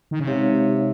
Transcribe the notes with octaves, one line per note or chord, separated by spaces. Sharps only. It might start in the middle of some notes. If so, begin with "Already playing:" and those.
D#3
C#3
C3 G#3 D#4 G4 C#5 F5